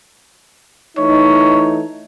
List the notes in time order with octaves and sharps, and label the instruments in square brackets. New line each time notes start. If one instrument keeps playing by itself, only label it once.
[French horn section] E3 A3 D#4 [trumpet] C#5